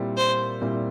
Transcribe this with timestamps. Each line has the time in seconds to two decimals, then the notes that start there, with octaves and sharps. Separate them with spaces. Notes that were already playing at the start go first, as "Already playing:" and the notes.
Already playing: A#2 G3 C4 E4
0.17 C5
0.61 A#2 G3 C4 E4